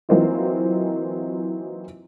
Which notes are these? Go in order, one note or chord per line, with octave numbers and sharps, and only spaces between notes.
E3 F#3 A#3 C4 D#4 F4